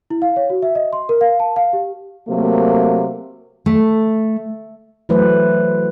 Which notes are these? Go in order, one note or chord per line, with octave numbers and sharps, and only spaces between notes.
E4
F5
C#5
F#4
E5
D#5
C6
A#4
F5
A5
F5
G4
C3 F#3 A3 A#3
A3
E3 F#3 A3 B4 C5